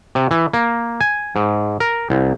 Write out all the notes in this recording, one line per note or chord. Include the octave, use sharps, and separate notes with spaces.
C3
E3
A#3
G#5
G#2
A#4
C2